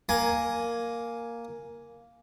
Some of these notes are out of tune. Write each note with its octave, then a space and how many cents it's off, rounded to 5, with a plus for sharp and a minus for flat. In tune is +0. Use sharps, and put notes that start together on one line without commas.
A#3 +0 G#5 +0